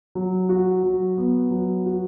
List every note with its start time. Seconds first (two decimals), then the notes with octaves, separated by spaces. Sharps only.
0.15 F#3
0.49 F#4
0.83 F#3
1.18 B3
1.51 F#3
1.86 F#4